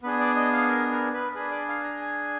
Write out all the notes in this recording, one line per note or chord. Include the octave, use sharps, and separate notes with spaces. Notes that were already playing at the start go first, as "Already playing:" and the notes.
B3 D4 G#4 B4
D5
D#5
F5
A#4
A#4
B4
D4 G#4 B4
D5
F5
A#5
G#5